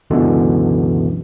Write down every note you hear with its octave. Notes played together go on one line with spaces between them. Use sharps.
C#2 F#2 B2 D3 E3